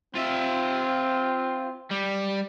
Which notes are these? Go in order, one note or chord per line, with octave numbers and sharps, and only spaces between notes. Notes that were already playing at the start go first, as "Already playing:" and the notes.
C4 F4 E5
G3